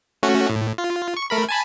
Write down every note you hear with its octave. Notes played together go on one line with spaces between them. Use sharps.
A3 C#4 F#4
A2
F4
C#6
A3 A#4 B5
G#5 A5 B5